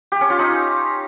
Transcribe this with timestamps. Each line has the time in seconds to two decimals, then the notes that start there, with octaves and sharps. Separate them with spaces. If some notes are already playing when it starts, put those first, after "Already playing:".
0.12 G4
0.21 C#4
0.30 F4
0.39 D#4